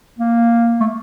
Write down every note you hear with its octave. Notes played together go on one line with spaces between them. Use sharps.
A#3
A3